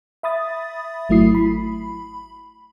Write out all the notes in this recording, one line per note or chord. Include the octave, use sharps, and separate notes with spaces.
E5 B5 D#6 A6
G#1 F#3 A3 E4 D#6 C7
B5